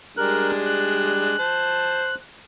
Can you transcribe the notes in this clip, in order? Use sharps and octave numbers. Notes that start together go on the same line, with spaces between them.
G3 G#3 D4 A#4 F#6
F#6
C5 A5